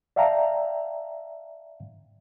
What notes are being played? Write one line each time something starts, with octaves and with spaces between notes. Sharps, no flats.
D5 E5 F5 G5 A5 A#5